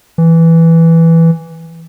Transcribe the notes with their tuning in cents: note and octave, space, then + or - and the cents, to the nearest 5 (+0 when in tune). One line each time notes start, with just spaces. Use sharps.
E3 +0